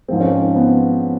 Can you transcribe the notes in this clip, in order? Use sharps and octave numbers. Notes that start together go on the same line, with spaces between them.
G#2 F3 G#3 C4
C#4
C4
B3